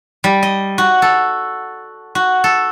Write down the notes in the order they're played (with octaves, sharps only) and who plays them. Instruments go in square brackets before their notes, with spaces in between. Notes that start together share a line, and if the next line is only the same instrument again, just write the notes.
[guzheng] G3
D#5
F#4
A4
F#4
A4